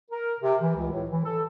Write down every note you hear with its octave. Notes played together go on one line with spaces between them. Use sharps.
A#4
C3
E3
C#2
A2
E3
A4